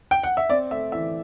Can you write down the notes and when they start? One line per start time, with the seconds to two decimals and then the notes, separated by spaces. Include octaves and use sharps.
0.11 G5
0.23 F#5
0.37 E5
0.50 C4 D5
0.71 A3 E5
0.92 E3 E5